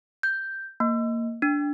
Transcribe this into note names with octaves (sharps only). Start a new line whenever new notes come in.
G6
A#3
D4